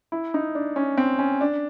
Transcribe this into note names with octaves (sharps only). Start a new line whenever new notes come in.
E4
D#4
D4
C#4
C4
C#4
D4